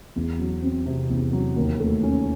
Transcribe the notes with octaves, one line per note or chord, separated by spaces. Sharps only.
E2
F#3
C4
C3
E2
F#3
D#2
A3
C#4